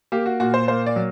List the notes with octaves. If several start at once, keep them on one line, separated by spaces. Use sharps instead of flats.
A#3 G4
F#4
A#2 F#4
C5
A#3 C5
D5
F#3